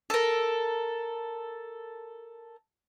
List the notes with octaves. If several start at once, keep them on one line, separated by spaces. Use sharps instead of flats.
A4 A#4